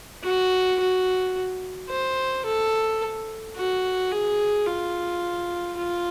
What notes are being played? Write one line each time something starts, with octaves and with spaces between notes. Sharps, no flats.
F#4
F#4
C5
A4
F#4
G#4
F4
F4